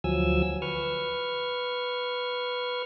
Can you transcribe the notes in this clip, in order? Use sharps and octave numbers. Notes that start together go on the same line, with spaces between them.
D2 F3 F#3 G#5 E6
B4 C#6 F6